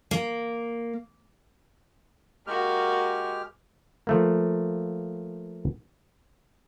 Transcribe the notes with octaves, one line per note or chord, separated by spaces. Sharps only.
A#3
G#3 A#3 F#4 G4 F6
F3 A3 A#3